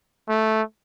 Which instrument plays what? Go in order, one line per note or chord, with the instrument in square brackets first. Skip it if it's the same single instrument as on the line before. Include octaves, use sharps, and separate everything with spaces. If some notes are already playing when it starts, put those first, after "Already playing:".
[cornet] A3